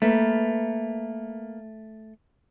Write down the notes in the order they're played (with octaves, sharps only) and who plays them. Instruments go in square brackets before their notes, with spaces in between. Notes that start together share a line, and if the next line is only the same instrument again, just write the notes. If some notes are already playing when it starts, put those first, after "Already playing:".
[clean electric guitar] A3 [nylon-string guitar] A#3 A#4 B4